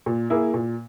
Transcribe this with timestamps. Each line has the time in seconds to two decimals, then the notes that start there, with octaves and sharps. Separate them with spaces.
0.06 A#2
0.30 A#3 E4 G#4
0.54 A#2